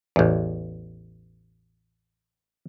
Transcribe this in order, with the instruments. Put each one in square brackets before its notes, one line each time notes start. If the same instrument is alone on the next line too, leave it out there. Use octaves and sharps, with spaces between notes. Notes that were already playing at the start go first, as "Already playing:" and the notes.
[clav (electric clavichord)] A1 E2